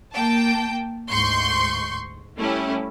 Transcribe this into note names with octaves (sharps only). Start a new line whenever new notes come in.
A#3 G5 A5
D2 G#2 C6 C#6 G6
G3 A3 C#4 E4 G4